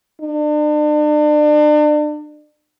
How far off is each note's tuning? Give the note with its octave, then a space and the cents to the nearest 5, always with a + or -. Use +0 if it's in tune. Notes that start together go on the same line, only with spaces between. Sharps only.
D4 +35